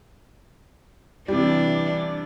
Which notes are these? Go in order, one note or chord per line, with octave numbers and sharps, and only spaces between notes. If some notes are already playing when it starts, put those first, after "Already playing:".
C3 E3 G3 D4